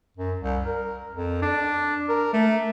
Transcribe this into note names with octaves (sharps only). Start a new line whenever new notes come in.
F#2
C2
A#4
F2
D4
A#4
A3